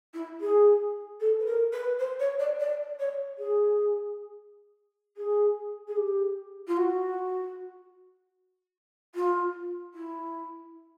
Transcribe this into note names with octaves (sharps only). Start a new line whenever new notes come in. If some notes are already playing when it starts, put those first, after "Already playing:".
E4
G#4
A4
B4
A#4
B4
C5
C#5
D5
D5
C#5
G#4
G#4
G#4
G4
F4
F#4
F4
E4